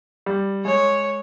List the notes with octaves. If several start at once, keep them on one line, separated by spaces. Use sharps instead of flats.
G3
G#3 C#5